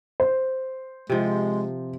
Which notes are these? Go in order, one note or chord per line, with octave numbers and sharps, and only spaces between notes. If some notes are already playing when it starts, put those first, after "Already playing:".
C5
C3 F3 G#3